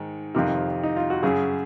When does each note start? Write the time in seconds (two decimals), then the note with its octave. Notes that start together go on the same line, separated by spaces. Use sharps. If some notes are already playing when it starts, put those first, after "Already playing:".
Already playing: G#2 D#3
0.35 F2 C3 D#3
0.83 D#4
0.96 F4
1.10 F#4
1.23 F#2 C#3 G#4